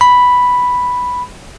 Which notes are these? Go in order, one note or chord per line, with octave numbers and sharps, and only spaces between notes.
B5